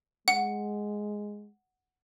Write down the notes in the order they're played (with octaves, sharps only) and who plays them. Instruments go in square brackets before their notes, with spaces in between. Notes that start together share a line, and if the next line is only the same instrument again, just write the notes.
[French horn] G#3 [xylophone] F#5